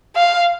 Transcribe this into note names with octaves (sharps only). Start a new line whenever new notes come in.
F5